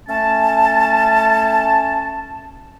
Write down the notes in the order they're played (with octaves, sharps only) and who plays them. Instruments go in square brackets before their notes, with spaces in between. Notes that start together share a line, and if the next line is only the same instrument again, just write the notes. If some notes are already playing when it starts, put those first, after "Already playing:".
[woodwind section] A3 C#4 A5